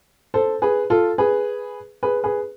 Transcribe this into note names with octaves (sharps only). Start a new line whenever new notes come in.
A4 C5
G#4 B4
F4 A4
G#4 B4
G#4 B4
G#4 B4